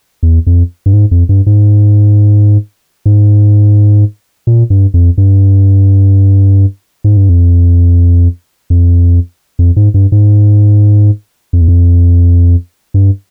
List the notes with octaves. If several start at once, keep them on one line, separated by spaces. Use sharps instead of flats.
E2
F2
G2
G#2
F2
G2
G#2
G#2
A#2
G2
F2
G2
G#2
G2
F2
F2
F2
G#2
G2
G#2
F2
E2
F2
G2